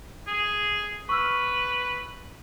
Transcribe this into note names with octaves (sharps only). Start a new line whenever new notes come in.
G#4
B4 C#6 E6 F6